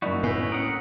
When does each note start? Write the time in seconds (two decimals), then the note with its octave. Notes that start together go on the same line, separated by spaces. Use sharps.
0.02 F#2 A#3 D#4 E4 F#4 D5
0.23 A2 B3 G#5
0.52 C#4 A#4 F#5 D#6